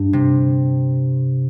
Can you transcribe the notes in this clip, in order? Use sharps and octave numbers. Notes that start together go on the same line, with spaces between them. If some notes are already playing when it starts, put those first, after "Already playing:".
Already playing: G2
C3